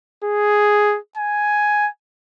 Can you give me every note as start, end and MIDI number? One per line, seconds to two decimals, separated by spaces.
0.24 0.98 68
1.17 1.88 80